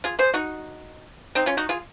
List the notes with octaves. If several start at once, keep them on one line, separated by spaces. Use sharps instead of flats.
F4 G#4
G#4 C5
D#4 F#4
C4 D#4
C#4 F4
D#4 F#4
F4 G#4